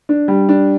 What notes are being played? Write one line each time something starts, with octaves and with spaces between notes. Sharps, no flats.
D4
G3
D4